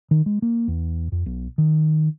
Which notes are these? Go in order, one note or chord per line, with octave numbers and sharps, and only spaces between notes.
D#3
G#3
A#3
E2
F2
B1
D#3